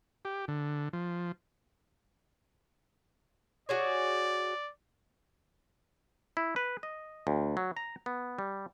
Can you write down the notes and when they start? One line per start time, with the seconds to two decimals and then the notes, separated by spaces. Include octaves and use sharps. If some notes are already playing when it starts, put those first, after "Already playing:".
0.25 G4
0.48 D3
0.93 F3
3.69 F#4 G#4 C#5 D5
6.37 E4
6.56 B4
6.83 D#5
7.27 D2
7.57 F#3
7.77 A#5
8.06 B3
8.39 G3